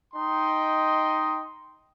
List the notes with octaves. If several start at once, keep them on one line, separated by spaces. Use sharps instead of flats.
D#4 D#5 G5 C6